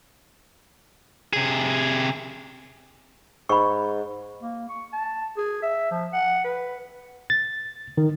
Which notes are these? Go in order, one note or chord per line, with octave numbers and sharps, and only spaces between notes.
C3 G#4
G#2 B5 C#6
A#3
C#6
A5
G#4
E5
F3
F#5
B4
A6
D#3